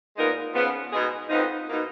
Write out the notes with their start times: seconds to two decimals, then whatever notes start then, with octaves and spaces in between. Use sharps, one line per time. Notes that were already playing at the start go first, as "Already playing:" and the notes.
0.17 A#2 G#3 B3 D#4 A#4
0.54 C#3 F3 B3
0.92 B2 G#3 D#4 G#4
1.30 F2 F3 B3 D#4
1.68 B2 A#3 D#4